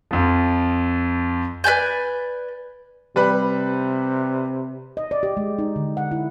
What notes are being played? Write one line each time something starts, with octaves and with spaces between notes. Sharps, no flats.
F2 F3
B4 D5 G#5 G6
C3 G3 B4 B5
D#5
D5
G4
G#3
D#4
D3
F#5
E4